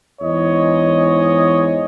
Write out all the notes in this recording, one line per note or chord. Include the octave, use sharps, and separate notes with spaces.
E2 G#2 C#5 D#5